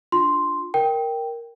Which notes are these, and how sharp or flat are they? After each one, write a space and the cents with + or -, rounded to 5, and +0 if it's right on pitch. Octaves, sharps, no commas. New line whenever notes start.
D4 +0 F4 +0 C6 +0
A#4 +0 G5 +0